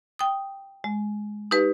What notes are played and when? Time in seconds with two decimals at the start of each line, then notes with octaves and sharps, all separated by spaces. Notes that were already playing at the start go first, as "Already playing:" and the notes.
0.19 G5 D#6
0.84 G#3
1.51 D#4 G4 B4